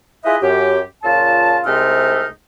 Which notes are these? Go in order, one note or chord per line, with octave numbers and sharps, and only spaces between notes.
E4 F4 G#4 B4 D#5 E5
F#2 G4
A#2 C#3 F4 A5
C2 C3 G#3 A3 D#4 F6